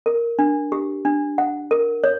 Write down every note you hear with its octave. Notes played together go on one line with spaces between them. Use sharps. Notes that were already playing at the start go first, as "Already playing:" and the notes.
A#4
D4
G4
D4
F#5
A#4
C#5